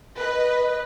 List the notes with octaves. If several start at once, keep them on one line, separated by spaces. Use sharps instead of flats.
B4 D#5